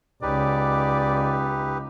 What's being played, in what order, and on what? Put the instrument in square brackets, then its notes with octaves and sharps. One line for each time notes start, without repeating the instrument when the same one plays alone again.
[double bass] C#2 [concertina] D#4 G4 B4 [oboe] D5